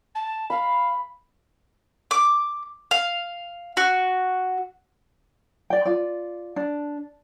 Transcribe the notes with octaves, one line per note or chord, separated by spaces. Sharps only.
A5
F5 B5
D6
F5
F#4
D5 G5
F4 D5
D4